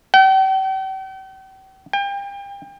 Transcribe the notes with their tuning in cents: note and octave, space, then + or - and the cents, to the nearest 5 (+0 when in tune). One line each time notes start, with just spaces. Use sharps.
G5 -40
G5 +35